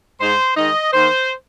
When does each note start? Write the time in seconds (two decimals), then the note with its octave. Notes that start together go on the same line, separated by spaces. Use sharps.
0.20 G#2 G#3 D#4 C5
0.56 D#3 G#3 D#4 D#5
0.93 D#3 A#3 D#4 C5